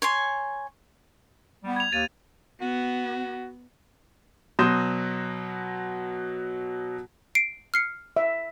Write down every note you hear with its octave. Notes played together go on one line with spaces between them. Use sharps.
C#5 G#5 C6
G3 B3
G#6 F7
D#2 A6 D#7
B3 F#4
B2 F#3 C6 D#6 G6 E7
C7 D7
F6 C7 C#7
E5